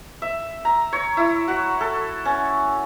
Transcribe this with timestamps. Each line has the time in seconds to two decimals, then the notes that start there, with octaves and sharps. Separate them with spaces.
0.22 E5
0.65 A#5
0.93 C#5
1.17 E4
1.48 F#4
1.81 A4
2.25 C#4